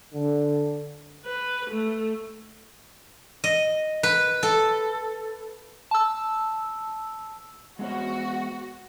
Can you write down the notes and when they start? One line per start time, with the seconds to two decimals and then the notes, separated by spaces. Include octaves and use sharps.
0.14 D3
1.25 B4
1.70 A3
3.44 D#5
4.03 B4
4.43 A4
5.91 A5 E6
7.79 G#3 B3 F#4 C#5